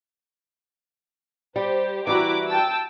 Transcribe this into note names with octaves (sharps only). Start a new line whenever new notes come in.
G3 G4 C5
E3 G3 E4 F#4 A#5 D6
G5 A5 E6